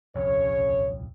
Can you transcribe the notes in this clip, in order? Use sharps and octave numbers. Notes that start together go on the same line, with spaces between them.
D#1 C2 F2 C#3 C#5